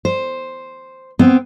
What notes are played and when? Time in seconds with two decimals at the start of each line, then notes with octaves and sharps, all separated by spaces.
0.05 C5
1.19 B3 C4